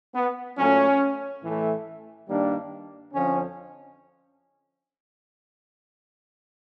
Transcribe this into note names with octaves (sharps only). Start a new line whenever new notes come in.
B3
A#2 F#3 A3 C#4
A2 E3 A3
G2 D#3 G3 A#3 D4
F2 D3 F3 C#4